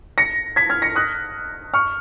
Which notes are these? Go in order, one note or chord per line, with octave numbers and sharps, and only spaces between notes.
A#6 C#7
G#6 B6
F6 G#6
A#6 C#7
D#6 F#6
C#6 F6